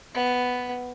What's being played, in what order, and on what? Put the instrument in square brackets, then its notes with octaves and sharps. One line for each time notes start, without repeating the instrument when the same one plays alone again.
[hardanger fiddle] B3